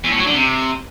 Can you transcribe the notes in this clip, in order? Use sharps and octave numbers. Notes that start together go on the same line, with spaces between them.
E2
A2
F#3
D3
C3